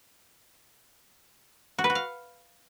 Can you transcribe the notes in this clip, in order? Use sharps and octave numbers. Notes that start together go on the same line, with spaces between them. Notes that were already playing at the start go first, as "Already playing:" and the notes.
F#4
B4
F#4
F5